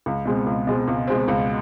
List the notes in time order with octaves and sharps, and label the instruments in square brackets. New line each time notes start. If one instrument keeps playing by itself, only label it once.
[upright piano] C#2
B2 G#3 C4
C#2
B2 G#3 C4
C#2
B2 G#3 C4
C#2